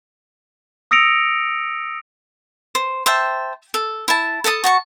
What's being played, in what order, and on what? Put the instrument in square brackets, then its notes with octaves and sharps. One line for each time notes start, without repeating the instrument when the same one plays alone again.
[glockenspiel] D#6 E6 A#6 C#7 D7 F7
[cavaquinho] C5
C5 E5 G5 A5
A4
E4 A5
A4 A5 A#5 D#6
F#4 A5 C#6